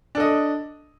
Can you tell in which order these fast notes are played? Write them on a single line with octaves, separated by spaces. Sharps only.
D4 A4 D#5